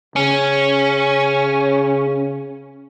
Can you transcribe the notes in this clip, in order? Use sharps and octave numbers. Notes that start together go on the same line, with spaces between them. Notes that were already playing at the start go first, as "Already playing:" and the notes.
C#3 C#4